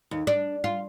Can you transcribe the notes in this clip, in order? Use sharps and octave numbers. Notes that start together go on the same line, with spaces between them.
D#2
D4
F4